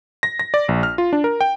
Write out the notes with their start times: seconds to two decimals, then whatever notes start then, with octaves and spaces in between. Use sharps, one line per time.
0.23 A#6
0.39 A#6
0.54 D5
0.69 A#1
0.83 F6
0.98 F4
1.13 D4
1.24 A#4
1.41 G5